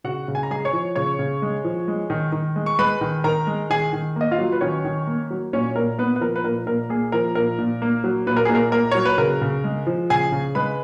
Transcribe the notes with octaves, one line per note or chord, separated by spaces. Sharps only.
C#3 F#4 F#5
C#3
G#5
A#5
G#3 G#4 G#5
C#5 C#6
F3
C#3 C#5 C#6
C#3
G#3
F3
G#3
D#3
D#3
G#3
C#6
G#3 B4 B5
D#3
D#3 A#4 A#5
G#3
D#3 G#4 G#5
D#3
A#3 D#5
F4 F5
F#3
B4
D#3 C#4 C#5
D#3
A#3
F#3
A#2 C#4 C#5
A#2 A#4
A#3 B3 B4
B4
F3 A#4
B4
A#2 A#4
A#2 A#4
A#3 G#4
F3 A#4
A#2 A#4
A#2
A#3
F#3
A#2 B4
A#4
A#2 G#4
A#4
A#3 A#4
F#3 C#5
B4
C#3 A#4
C#3
G#3
F3
C#3 G#4 G#5
C#3
G#3 B4 B5